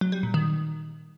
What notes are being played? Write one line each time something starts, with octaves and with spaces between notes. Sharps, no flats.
F#3
G3
A#2
D#3